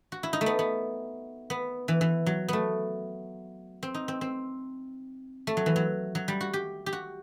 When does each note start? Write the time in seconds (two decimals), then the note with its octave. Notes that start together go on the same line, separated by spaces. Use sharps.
0.12 F#4
0.23 E4
0.33 D#4
0.41 A3
0.46 B3
0.59 B3
1.50 B3
1.88 E3
2.01 E3
2.26 F#3
2.48 A3 B3
3.83 C4
3.94 D#4
4.08 C4
4.21 C4
5.47 A3
5.57 F#3
5.66 E3
5.76 F#3
6.15 F#3
6.28 G3
6.41 F#4
6.53 G4
6.86 G4
6.93 F#4